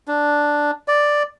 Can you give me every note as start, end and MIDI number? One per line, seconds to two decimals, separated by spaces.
0.08 0.71 62
0.88 1.23 74